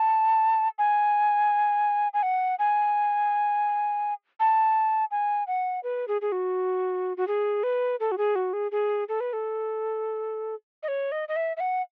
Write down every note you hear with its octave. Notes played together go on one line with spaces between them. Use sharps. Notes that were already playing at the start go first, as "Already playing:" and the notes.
Already playing: A5
G#5
G#5
F#5
G#5
A5
G#5
F#5
B4
G#4
G#4
F#4
F#4
G#4
B4
A4
F#4
G#4
F#4
G#4
G#4
A4
B4
A4
D#5
C#5
D#5
D#5
E5
E5
F#5